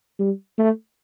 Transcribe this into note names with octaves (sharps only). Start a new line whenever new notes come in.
G3
A3